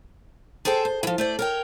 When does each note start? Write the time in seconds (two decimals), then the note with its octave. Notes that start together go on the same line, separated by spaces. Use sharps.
0.65 G#4 A4 C5 G5 A5
0.85 C5
1.03 E3 F3
1.18 A3 C5 D5
1.39 A#4 C#5 G5